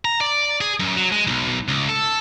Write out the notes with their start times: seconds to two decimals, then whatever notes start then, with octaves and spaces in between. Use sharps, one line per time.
0.05 A#5
0.21 D5
0.61 G#4
0.80 F#2
0.96 F#3
1.12 G#3
1.27 B1
1.68 C#2
1.89 A4